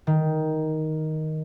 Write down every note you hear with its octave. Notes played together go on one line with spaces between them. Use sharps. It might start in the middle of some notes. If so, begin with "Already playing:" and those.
D#3